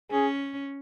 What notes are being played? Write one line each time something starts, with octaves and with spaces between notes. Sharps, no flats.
C#4 G#4